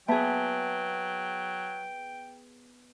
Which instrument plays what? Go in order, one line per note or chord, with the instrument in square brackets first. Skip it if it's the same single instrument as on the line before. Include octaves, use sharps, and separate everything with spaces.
[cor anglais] F#3 [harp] B3 G#4 [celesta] E5 A5 B6 [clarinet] G5